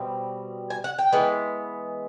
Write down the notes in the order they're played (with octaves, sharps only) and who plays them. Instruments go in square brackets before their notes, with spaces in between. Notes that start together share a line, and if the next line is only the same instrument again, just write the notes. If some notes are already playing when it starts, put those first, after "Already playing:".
Already playing: [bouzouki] B2 G3 C4
G#5
F#5
G5
E3 G#3 B3